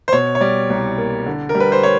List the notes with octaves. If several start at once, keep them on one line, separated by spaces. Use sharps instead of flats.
C5
B2 C#5
C#5
G3 D5
C2
A#3
D3
A#4
G3
B4
C5
C#5